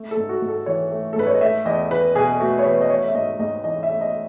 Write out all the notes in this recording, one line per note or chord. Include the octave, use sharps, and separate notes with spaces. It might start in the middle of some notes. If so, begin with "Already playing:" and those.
Already playing: A3
A4
G#2
F#4
G#2
A4
E3 C#5
A3
A4
G#2 B4
C#5
D#5
A3 E5
E2 D#5
E2 B4
B2 G#4
A3 F#4
C#5
E2 B4
D#5
A3 C#5
E5
G#2 D#5
G#2 D#5
E3 D#5
E5
A3
D#5